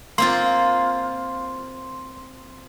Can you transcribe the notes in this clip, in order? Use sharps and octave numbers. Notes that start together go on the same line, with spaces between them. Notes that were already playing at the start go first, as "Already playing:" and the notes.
A#3 C4 F4 C6